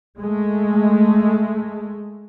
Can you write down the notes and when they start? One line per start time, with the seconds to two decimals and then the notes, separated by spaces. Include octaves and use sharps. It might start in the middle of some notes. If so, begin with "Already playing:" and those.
0.20 G#3 A3